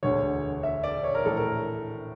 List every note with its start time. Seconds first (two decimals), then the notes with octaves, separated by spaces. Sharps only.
0.03 E1 D2 D3 C#5
0.63 E5
0.84 D5
1.03 C#5
1.15 A#4
1.23 A#1 A2 E3 A4
1.37 A#4